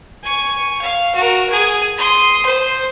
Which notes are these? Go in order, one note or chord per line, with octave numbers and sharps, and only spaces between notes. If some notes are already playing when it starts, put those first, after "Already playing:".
G#5 C#6
F5
F#4 A#4
G#4 G#5
C6 D#6
C5